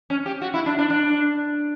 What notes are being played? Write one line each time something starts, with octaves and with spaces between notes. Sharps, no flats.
C#4
G4
F#4
E4
D4
D4
D4